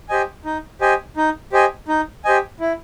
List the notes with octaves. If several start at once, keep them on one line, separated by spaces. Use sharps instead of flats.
G4 C5 D#5 G#5
D#4
G4 C5 D#5 G#5
D#4
G4 C5 D#5 G#5
D#4
G4 C5 D#5 G#5
E4